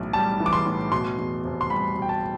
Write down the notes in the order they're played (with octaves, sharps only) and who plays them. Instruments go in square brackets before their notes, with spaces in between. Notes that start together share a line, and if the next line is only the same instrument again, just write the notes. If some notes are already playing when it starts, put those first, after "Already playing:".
Already playing: [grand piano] B1 A2 E3
G3 A5
E3
D6
C6
A2
B2 C6
E2
F1
C6
G3 B5
B2
G5
A5